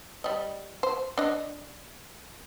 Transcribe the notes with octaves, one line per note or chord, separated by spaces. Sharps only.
G3 D#5
C5
D4 D#5